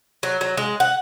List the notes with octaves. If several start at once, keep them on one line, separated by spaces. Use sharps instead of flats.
F#3
F#3
G#3
F#5